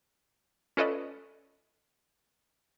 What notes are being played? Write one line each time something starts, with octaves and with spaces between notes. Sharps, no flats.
C#4 F4 A4 B4 D5 D#5